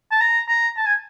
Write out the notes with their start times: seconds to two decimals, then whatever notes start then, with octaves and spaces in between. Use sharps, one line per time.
0.12 A5
0.21 A#5
0.49 A#5
0.77 A5
0.87 G#5